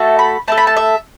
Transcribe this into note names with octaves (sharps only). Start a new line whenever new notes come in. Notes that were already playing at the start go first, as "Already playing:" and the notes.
Already playing: A3 F#4 A4
B5
A3 E4 A4 A5
B5
A5
E5